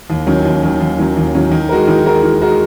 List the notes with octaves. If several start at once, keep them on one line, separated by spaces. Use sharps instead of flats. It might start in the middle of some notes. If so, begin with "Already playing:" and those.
D#2
D#3 F#3 C#4
D#2
D#3 F#3 C#4
D#2
D#3 F#3 C#4
D#2
D#3 F#3 C#4
D#3
G#3 F#4 A#4
D#3
G#3 F#4 A#4
D#3
G#3 F#4 A#4